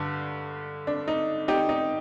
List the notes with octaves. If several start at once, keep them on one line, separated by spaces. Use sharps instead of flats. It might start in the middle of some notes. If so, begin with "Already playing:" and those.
Already playing: G2 D3
D4
D#4
D#4 G4
D#4